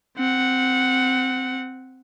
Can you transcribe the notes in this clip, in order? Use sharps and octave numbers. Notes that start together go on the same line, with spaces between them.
C4 F#5